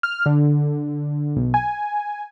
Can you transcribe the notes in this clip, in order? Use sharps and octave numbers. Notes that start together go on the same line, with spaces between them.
F6
D3
B1
G#5